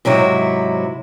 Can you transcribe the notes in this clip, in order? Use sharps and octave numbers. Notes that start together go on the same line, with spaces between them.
G#2 C3 F#3 E4